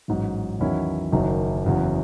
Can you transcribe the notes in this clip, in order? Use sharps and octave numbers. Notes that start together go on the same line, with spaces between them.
A1 G#2 F#3
E2 D#3 F#3 C#4 E4
F#1 F#2 D#3 F#3
F#1 E2 C#3 F#3